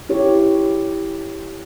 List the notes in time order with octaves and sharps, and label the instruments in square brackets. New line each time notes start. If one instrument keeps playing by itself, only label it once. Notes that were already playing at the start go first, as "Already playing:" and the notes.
[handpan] E4 G4 C#5